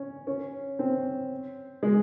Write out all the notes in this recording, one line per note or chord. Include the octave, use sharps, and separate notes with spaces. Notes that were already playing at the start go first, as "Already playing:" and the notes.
Already playing: C#4
C#4
C4
G#3